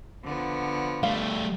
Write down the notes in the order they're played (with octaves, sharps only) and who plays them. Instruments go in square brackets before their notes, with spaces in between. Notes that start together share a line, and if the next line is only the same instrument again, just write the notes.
[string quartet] D3 F3 B3
[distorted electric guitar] G3 A3 [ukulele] F5